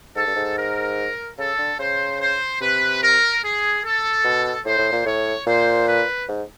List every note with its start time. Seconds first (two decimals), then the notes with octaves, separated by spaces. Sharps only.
0.15 G#2 A4
0.27 G2
0.36 G#2
0.57 A#4
1.38 C#3 A4
1.58 D3
1.79 C#3 C5
2.20 C5
2.61 C3 B4
3.02 A#4
3.42 G#4
3.83 A4
4.24 B2
4.65 A2 C5
4.79 A2
4.92 A#2
5.05 A2 C#5
5.46 A#2 C5
5.87 B4
6.28 G#2